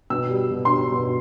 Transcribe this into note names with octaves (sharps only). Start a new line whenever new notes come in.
B2 E6
G3
B2
C6
G3
B2